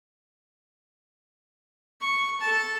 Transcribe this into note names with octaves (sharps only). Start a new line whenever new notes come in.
C#6
A4 A5